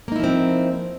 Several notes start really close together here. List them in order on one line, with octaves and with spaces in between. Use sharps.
A#3 D#4 E4 F3 C4